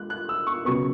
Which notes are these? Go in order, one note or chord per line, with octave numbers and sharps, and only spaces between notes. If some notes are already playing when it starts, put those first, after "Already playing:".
Already playing: G#3 F#6
F#6
E6
C#6
C#3 F#3 B3 C#6